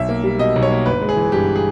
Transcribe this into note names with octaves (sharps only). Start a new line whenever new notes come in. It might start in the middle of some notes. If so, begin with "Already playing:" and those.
Already playing: B1 E5
A#3
G3
B2 D#5
B1
C#5
A#3
G1 B4
G#3
G#4
E3
G2 G4
G#4